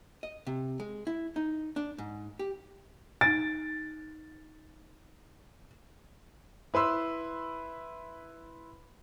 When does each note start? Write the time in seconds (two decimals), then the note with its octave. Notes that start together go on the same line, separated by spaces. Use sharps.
0.23 D#5
0.47 C3
0.80 G#3
1.07 E4
1.36 D#4
1.76 D4
1.98 G#2
2.39 G4
3.21 D#4 A6 D7
6.74 E4 B4 C6 E6